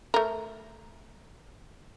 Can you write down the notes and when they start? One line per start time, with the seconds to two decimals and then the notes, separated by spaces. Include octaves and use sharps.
0.14 A3 A#4